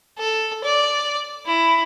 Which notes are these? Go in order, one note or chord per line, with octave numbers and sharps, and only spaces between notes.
A4
D5
E4